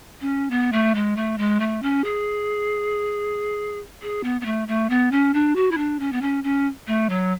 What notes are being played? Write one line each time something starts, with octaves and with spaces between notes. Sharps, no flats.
C#4
B3
A3
G#3
A3
G#3
A3
C#4
G#4
G#4
B3
B3
A3
A3
B3
C#4
D4
F#4
E4
D4
C#4
B3
C#4
C#4
A3
F#3